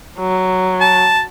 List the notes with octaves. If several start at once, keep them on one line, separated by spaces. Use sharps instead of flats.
F#3
A5